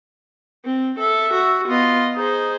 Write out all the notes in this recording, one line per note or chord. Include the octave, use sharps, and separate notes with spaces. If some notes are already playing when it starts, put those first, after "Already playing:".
C4
A4 E5
F#4
B3 F4 D#5
D#4 G#4 C5